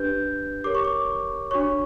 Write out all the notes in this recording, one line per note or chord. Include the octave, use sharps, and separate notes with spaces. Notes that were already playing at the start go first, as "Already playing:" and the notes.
Already playing: D4 G4 B4 G6
G4 A#4 C#5 D6
C#6
D6
D4 F#4 C#5 C#6